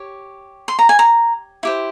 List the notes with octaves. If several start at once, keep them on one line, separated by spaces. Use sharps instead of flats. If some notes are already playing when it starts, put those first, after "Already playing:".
Already playing: G4 C#5
C6
A#5
G#5
A#5
E4 G4 C5